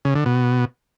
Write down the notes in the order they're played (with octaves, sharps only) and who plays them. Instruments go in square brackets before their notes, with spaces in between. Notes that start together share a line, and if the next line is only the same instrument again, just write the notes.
[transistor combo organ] C#3
D3
B2